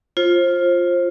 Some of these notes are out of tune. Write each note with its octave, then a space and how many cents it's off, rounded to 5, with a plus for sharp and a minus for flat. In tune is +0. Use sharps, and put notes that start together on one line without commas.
F4 +0 C5 +25